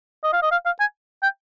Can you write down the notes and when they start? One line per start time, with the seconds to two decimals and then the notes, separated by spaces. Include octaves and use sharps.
0.24 D#5
0.33 F5
0.43 D#5
0.52 F5
0.66 F5
0.80 G#5
1.23 G5